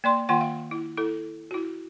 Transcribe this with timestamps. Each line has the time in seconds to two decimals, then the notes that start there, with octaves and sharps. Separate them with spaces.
0.04 A#3 D5 C6
0.29 D#3 A#3 F4 F#5 C6
0.41 F5
0.71 E4
0.97 E4 A4
1.51 E4 F#4